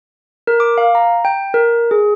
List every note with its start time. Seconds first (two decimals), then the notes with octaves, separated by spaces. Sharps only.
0.47 A#4
0.60 D6
0.78 F5
0.95 A#5
1.25 G5
1.54 A#4
1.91 G#4